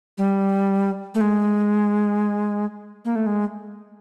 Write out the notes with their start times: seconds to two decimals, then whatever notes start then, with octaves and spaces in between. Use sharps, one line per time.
0.18 G3
1.15 A3
1.21 G#3
3.05 A#3
3.16 A3
3.26 G#3